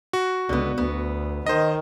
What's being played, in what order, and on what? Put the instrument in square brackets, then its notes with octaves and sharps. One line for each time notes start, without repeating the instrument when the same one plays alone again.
[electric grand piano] F#4
[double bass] C#2 [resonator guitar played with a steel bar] D3 B3
[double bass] D2 [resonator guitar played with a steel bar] B3
[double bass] D#3 [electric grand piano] C5 D#5